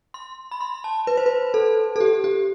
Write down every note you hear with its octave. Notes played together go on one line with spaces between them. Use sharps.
C6
B5
C6
A5
B4
C5
B4
A4
A4
G4
G4